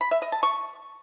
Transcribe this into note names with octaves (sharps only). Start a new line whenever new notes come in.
B5
E5
D#5
A5
C#6